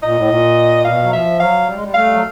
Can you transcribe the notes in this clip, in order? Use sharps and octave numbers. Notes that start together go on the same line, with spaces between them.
A#2 D#5
A2
A#2
B2 F5
F#3
F3 E5
F#3 F5
G3
G#3
G3
A3 F5
G3
F#3